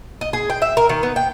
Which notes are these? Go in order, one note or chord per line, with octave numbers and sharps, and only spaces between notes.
D#5
G#4
G5
E5
A#4
D#3
B3
G5